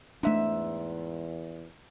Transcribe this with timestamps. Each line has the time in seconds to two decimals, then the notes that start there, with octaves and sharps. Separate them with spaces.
0.23 E2 G#2 A3 D4 E5